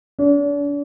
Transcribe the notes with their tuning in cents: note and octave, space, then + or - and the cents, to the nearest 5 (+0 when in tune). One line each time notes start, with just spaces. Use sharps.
D4 -40